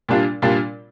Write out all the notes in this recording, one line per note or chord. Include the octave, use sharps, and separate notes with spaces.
A#2 G3 D4 F4
A#2 G3 D4 F4